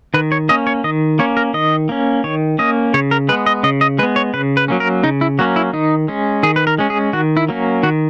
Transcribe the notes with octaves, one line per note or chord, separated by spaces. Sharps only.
D#3 B4
C#5
A#3 C#4 D#5
C#5
D#3 D#5
A#3 C#4 C#5
A#4
D#3 D#5
A#3 C#4
D#3 C#5
A#3 C#4 D#5
C#3 C#5
A#4
G#3 B3 B4
D#5
C#3 D#5
D#5
G#3 B3 B4
C#5
C#3 B4
B4
F#3 A#3 C#4
A#4
C#3 D#4
E4
F#3 A#3 C#4 F#4
E4
D#3 D#4
G#3 C#4
D#3 G#4
B4
A#4
G#3 C#4
G#4
D#3 F#4
E4
F#3 A#3 C#4
D#3 F#4